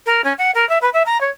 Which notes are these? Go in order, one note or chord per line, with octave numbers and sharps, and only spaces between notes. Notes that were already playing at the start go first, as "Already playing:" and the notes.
A#4
C#4
F#5
A#4
E5
B4
E5
A#5
C#5